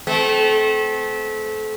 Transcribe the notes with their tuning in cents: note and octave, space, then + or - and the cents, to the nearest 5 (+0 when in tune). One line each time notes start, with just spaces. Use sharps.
A3 -30 C4 -25